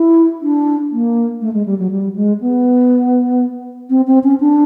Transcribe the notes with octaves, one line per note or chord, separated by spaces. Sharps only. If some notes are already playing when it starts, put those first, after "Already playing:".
Already playing: E4
D4
A#3
A3
G#3
G3
F#3
G3
G#3
B3
C4
C4
C#4
D4